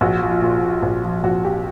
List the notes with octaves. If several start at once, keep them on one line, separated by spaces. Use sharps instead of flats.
A#1 F#4
F3
F4
A#2
A#2
A#1
F3
A#1 F#4
A#2 G4